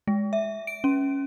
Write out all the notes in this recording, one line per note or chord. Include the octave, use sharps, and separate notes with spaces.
G#3
E5
D7
C#4